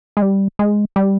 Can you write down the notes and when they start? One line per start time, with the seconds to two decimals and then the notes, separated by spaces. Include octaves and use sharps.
0.17 G#3
0.22 G3
0.59 G#3
0.96 G3